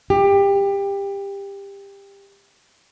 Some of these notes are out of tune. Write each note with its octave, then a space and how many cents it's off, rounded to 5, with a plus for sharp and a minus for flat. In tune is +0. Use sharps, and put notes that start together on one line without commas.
G4 +20